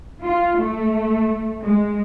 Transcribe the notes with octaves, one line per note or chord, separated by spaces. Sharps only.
F4
A3
G#3